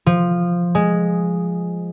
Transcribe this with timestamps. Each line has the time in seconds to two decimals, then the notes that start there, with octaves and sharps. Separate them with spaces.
0.06 F3
0.75 G#3